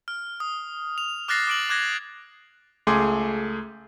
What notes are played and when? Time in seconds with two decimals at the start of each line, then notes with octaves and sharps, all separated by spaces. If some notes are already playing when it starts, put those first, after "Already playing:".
0.08 F6
0.40 D#6
0.98 F7
1.28 D6 F6 F#6 A6 A#6 C7
1.47 D6 D7 F#7
1.70 D6 F#6 G#6 A#6
2.87 C#2 A3 G#4 C6 D6